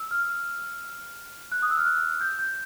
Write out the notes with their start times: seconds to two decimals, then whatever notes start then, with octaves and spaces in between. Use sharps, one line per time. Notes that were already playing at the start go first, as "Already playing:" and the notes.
Already playing: E6
0.11 F6
1.52 F#6
1.62 D#6
1.70 E6
1.78 F6
1.86 F#6
2.21 G6
2.39 G6